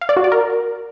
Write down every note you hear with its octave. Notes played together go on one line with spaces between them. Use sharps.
F5
D5
F#4
D5
A#4